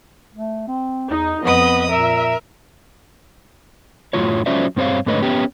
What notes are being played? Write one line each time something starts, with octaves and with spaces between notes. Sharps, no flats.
A3
C4
E2 D#4
F2 B3 B4 D#5 D#6
A#2 A#4 E5
F#2 A2 F#3 G3 F4 C#5
F#3 C#4 F4 C5 D5 E5
G2 C4 C5 C#5 F5
G#2 D3 A3 B4 C#5 D#5
B3 C#4 G4